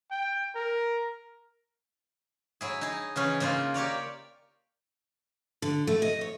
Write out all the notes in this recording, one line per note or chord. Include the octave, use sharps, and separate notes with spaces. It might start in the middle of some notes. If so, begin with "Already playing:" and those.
G5
A#4
F#3 E4 G#4
D#4 G#4
C#3 E3 C#4 G#4
C#3 A#3 D#4 F4
G4 A#4 C#5 D5
D3
A3
D#5
C#5